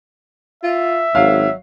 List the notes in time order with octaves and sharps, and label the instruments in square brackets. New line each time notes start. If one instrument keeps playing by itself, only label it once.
[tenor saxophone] F4 [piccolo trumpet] E5
[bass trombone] G#1 [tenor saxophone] F#3 [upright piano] F5